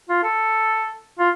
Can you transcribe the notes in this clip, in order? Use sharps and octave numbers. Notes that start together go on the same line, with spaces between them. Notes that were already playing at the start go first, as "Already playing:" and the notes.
F4
A4
F4